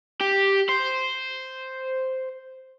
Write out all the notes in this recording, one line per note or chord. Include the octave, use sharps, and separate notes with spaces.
G4
C5